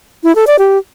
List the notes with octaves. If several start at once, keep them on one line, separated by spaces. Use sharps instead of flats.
E4
A4
D5
G4